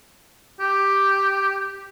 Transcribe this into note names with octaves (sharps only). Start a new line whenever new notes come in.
G4